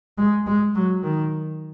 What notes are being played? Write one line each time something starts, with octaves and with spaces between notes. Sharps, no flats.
G#3
G#3
F#3
D#3